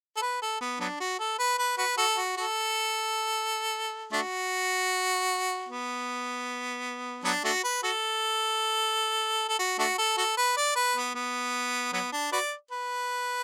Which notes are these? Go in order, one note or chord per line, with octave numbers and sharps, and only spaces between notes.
A4
B4
A4
B3
F#3 B3 D4
F#4
A4
B4
B4
F#4 B4
F#4 A4
F#4
F#4 A4
A3 D4 F#4
B3
F#3 B3 D4
A3 D4 F#4
B4
F#4 A4
A4
F#4
A3 D4 F#4
A4
F#4 A4
B4
D5
B4
B3
B3
F#3 B3
D4
F#4 B4 D5
B4